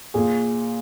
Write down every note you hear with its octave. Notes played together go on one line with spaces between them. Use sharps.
A#2 G#4